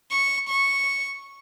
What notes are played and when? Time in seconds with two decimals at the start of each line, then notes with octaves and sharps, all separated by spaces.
0.11 C#6
0.49 C#6